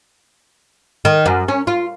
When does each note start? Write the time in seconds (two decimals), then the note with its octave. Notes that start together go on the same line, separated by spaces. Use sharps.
1.05 D#3
1.26 F#2
1.48 C#4
1.67 F4